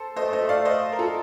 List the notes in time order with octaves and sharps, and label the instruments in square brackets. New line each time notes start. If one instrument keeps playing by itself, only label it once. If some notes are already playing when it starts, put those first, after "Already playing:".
Already playing: [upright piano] A4 C5
[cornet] A3 [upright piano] C5 D#5
[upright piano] C5 D#5
D5 F5
C5 D#5
A#4
F4 A4